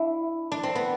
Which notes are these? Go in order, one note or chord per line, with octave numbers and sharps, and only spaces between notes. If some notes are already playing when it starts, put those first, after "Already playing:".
Already playing: D4 E4
D4
C4
B3